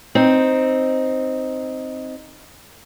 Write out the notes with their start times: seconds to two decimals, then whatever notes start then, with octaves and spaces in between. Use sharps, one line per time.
0.15 C4 D#4